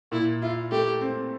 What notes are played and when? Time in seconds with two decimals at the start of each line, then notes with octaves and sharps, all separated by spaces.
0.12 A#2 E4
0.42 E4 F4
0.71 A3 G4
1.01 C4